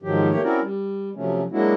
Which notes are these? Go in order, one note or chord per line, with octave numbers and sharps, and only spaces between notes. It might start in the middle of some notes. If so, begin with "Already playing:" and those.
G#2 D#3 F3 F#3 G4
A3 A#3 G4 C#5
C4 C#4 E4 F#4 A#4 D5
G3
C3 F3 F#3 A3 C#4
F#3 G#3 A#3 D4 E4 F#4